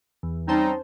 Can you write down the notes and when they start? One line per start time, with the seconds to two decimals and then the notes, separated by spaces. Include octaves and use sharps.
0.23 E2
0.48 G3 C4 C#4 D#4 C5 A5